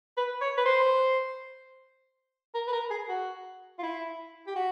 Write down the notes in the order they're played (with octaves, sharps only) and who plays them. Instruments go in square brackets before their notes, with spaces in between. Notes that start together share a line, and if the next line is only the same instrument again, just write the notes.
[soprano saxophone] B4
C#5
B4
C5
A#4
B4
A#4
G#4
F#4
F4
E4
G4
F#4